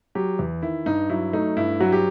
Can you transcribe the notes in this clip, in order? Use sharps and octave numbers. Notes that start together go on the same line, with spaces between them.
F#3 G4
E2
D#3 E4
G2 D#4
F#3 E4
A3 D#4
G2 E4
F#3 F#4
G4